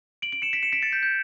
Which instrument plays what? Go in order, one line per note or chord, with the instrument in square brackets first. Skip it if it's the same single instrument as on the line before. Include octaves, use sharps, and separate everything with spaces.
[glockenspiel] D7 F#7
D7 F#7
C#7 E7
B6 D7
C#7 E7
B6 D7
A6 C#7
G6 B6
G6